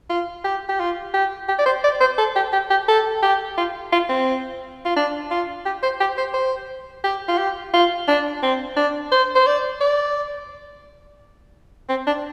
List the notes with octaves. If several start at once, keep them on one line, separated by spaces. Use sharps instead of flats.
F4
G4
G4
F4
G4
G4
D5
C5
D5
C5
A4
G4
G4
G4
A4
G4
F4
F4
C4
F4
D4
F4
G4
C5
G4
C5
C5
G4
F4
G4
F4
D4
C4
D4
C5
C5
D5
D5
C4
D4